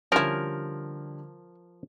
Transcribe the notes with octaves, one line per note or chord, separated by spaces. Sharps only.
D3 F3 G3 C#4 E4 A#4